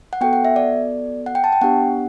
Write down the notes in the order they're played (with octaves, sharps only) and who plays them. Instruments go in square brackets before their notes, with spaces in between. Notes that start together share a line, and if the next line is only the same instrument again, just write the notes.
[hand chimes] F#5
B3 F#4 A4 G5
F#5
E5
D5
F#5
G5
A5
G5
B3 D4 G4 F#5